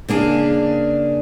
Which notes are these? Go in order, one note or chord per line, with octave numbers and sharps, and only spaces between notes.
C#3 A#3 D4 G#4